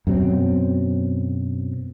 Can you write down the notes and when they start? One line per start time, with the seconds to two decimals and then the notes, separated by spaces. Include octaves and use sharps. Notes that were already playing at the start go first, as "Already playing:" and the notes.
0.07 F#2 B2 F#3 C4